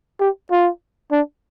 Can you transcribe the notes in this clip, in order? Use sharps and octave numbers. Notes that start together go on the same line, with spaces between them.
G4
F4
D4